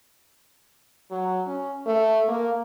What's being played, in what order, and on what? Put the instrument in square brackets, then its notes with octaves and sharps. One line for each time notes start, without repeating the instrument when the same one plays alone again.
[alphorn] F#3
C#4
A3
A#3